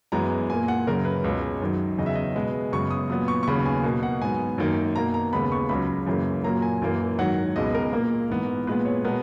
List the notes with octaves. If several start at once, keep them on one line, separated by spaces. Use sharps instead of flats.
F#2 E3 G#3 B3 A#5
A#2 A#3 G#5
F#5
F#2 C#3 F#3 A#4
B4
C#2 B2 G#3 C#5
F#2 D#3 F#3
E2 C#3 F#3 D#5
E5
D#5
B2 G#3 B3
F#2 C#3 G#3 B3 C#6
D#6
A#2 F#3 B3 D#6
C#6
C#6
D#2 C#3 F#3 B3 B5
G#5
B2 A#3
F#5
G#2 F#3 B3 G#5
F#2 D#3 A#3
B2 A#3 A#5
A#5
D#2 C#3 G#3 B3 B5
C#6
C#2 C#3 F#3 B5
F#2 C#3 E3 A#3
A#2 F#3 A#3 A#5
G#5
F#2 E3 A#3
G#2 D#3 F#3 F#5
C#2 B2 G#3 B3 D#5
A#4
A#2 A#3
G#2 E3 B3
A#2 G#3 B3 B4
C#5
B2 G#3 B3 A#4